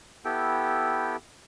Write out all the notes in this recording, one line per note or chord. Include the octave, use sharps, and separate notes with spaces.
B3 E4 G4 A4 G5